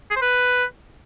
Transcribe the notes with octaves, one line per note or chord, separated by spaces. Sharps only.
G#4
C5
B4